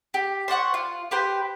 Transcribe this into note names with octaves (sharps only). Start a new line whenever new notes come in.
G4
C5 D5 F#5 C#6
F4
G4 B4 C5 G5